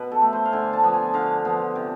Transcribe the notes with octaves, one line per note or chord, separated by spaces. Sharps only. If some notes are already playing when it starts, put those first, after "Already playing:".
Already playing: B2 B4
A4
A3
C5
F5
D3 G#5
A5
F3 B3
G#5
D3 F5
F3 B3
C3